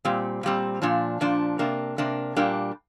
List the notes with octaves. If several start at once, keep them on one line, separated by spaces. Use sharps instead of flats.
A#2 G3 C4
A#2 G3 C4
A#2 F3 D4
A#2 F3 D4
C3 A#3 D4
C3 A#3 D4
A#2 G3 A#3 D4